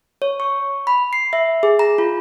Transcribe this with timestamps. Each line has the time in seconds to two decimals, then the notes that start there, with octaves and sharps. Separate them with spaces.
0.22 C#5
0.40 C#6
0.87 B5
1.13 C7
1.33 E5
1.63 G#4
1.79 A#5
1.98 F4